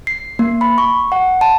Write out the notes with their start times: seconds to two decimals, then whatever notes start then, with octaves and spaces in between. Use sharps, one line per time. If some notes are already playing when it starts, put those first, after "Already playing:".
0.07 C7
0.39 A#3
0.61 B5
0.78 C#6
1.12 F#5
1.41 A5